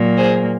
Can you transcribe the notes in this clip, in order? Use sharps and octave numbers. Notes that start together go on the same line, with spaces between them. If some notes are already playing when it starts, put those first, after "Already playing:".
Already playing: A#2 F#3 A#3
G#4 C5